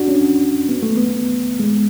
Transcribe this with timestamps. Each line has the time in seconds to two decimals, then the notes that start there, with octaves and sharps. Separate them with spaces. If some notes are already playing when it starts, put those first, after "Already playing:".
Already playing: D4 F#4
0.08 C#4
0.69 B3
0.83 A3
0.97 B3
1.59 G#3